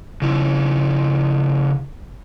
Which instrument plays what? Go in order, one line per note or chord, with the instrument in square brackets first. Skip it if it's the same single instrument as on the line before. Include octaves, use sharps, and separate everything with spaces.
[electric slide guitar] C#3 F3 E4